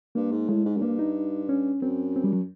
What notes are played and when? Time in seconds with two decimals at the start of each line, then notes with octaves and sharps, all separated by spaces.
0.15 G2 A#3
0.32 G#2
0.49 A2 G#3
0.65 G#2
0.77 F#2
0.82 G2 A#3
0.99 D#4
1.49 C#4
1.82 F#2 C4
2.16 C4
2.24 G3
2.33 F#3